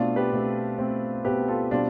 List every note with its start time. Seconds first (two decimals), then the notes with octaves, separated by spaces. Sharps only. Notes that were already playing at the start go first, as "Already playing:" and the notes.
Already playing: B2 A3 C4 D4 F4
0.16 G4 B4
0.32 B2 A3 C4
0.78 B2 A3 C4
1.25 B2 A3 C4 G4 B4
1.48 F4 A4
1.71 B2 G3 C4 D4 F4